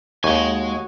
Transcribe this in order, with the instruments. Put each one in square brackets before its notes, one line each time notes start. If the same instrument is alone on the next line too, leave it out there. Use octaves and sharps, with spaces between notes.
[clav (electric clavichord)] D#2 [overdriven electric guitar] G#3 G#5 [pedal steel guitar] F#4 C#5